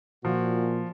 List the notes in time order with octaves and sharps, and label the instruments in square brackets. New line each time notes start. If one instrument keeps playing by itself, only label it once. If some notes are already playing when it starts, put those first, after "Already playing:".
[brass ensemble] A#2 [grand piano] F3 [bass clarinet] F#4